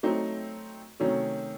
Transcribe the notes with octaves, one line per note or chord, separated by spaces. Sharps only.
F#3 A3 C4 D#4
C3 D#3 F#3 A3 C#4